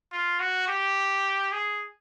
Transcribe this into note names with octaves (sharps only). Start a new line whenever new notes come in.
F4
F#4
G4
G#4